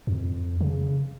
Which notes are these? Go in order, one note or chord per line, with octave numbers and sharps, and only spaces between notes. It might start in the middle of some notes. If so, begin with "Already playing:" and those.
F2
C#3